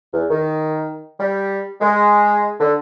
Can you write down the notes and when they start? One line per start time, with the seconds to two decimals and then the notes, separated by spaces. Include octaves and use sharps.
0.13 E2
0.30 D#3
1.19 G3
1.81 G#3
2.60 D3